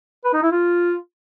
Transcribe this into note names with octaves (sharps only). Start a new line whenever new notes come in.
B4
D#4
E4
F4